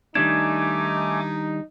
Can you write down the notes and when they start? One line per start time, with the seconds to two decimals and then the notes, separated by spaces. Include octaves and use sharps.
0.15 D#3 G3 A3 D4 D#4 G#5 D6 G#6